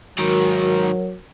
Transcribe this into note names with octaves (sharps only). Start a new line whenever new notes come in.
G#2 D#3 F#3 F#4 A#4